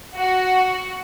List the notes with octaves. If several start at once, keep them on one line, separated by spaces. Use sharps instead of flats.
F#4